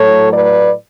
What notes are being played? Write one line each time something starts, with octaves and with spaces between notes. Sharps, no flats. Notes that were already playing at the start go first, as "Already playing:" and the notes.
Already playing: A2 F#3 A3 A4 C#5
B4 D5